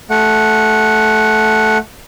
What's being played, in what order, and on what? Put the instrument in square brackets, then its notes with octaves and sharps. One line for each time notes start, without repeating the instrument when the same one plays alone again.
[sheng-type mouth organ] A3 F#5